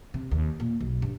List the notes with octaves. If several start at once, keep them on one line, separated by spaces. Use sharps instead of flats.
C3
D#2
A#2
B1
G2